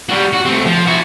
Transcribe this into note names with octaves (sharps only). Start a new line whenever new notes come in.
G3 F#4
F#4
A3 C4
F3
E4 F#4